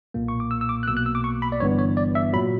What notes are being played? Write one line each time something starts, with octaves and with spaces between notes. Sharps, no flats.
B1 A#2 A#3
C#6
D6
E6
E6
D6
F#6
B1 B2 A#3 E6
F#6
E6
D6
C#6
B5
D5
G1 G2 E3 B3 C#5
C#5
D5
E5
A#2 F#3 B5